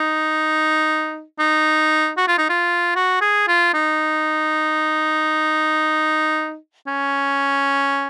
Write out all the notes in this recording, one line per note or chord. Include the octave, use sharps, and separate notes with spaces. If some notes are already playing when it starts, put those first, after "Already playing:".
Already playing: D#4
D#4
F#4
F4
D#4
F4
F#4
G#4
F4
D#4
C#4